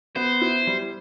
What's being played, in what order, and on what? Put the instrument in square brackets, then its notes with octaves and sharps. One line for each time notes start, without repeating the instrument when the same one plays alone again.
[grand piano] B3 [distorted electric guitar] C5
[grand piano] E4
G3